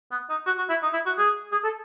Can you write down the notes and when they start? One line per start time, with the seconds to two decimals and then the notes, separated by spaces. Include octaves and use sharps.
0.11 B3
0.30 D#4
0.46 F#4
0.58 F#4
0.70 E4
0.83 D#4
0.93 E4
1.06 F#4
1.18 G#4
1.52 G#4
1.64 A4